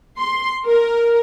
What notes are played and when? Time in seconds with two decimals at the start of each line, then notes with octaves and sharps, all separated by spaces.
0.19 C6
0.66 A#4